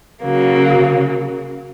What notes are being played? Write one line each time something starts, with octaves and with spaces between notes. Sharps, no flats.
C#3 F#3 A#3